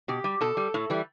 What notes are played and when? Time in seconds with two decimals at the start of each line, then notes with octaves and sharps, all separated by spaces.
0.08 B2 G4
0.24 G3
0.41 B2 A4
0.57 G3
0.74 A2
0.90 E3 G3